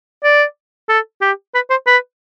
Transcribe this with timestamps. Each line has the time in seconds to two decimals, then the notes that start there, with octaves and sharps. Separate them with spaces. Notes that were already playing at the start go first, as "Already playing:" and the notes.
0.23 D5
0.89 A4
1.21 G4
1.54 B4
1.70 C5
1.87 B4